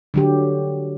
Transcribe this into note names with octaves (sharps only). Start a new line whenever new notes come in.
D3 F#3 G4